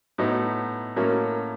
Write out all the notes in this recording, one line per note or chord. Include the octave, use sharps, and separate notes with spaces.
A2 F#3 B3 D#4
A2 F#3 A#3 C#4